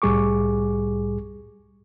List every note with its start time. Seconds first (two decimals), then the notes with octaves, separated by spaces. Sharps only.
0.02 C2 A2 G3 G#4 C#6 D6